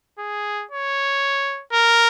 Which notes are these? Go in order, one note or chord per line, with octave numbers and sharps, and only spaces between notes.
G#4
C#5
A#4